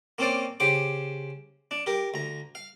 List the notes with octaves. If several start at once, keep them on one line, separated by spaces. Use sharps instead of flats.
A#3 C4 C#4 C5 D5 F5
C#3 G4 C5 D6
D4
G4 A#4
D2 A#5
F5